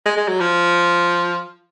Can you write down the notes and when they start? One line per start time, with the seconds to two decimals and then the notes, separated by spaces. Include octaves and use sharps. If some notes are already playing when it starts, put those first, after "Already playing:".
0.06 G#3
0.17 G#3
0.28 F#3
0.40 F3